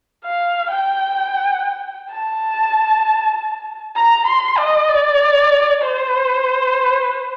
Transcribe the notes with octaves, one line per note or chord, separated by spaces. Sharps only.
F5
G5
A5
A#5
C6
D#5
D5
C5